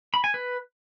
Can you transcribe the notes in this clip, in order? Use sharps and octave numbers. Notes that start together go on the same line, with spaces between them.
B5
G#5
B4